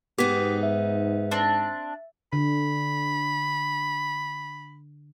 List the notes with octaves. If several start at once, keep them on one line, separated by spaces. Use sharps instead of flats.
G#2 B3 D#4 G4 B6
E5
C4 D4
D3 B5